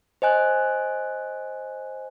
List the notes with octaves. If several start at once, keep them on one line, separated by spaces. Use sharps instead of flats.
C5 D#5 G#5 F#6